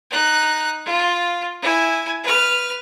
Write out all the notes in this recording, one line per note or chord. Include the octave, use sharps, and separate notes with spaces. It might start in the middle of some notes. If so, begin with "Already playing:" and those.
D#4 F#6
F4
E4 G#5
B4 F6